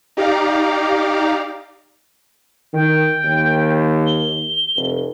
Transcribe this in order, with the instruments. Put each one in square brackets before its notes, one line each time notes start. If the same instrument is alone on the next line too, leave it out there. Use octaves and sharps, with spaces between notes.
[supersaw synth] D#4 G4 D5 F5 A#5 D6
[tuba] D#3 [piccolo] G5
[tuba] D#2
[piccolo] G7
[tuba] F1